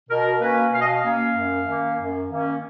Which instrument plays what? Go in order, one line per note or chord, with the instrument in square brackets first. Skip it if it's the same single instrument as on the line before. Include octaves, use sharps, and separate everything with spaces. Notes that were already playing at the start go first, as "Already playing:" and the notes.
[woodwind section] B2 A#4
A#3 C#4 B4
B2 F5
D#5
F5
A#3 C#4
F#2
D#3 A#3 C#4
F#2
D#3 A#3 C#4